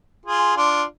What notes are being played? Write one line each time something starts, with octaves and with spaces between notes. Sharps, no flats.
F4 G#4
D4 F4